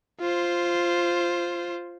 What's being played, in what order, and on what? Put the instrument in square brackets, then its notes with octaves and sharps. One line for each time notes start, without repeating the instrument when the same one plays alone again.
[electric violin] F4 C5